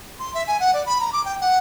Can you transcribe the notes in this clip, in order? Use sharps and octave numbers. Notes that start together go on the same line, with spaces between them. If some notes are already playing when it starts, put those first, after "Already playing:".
C6
E5
G#5
F#5
D5
B5
A#5
D6
G5
F#5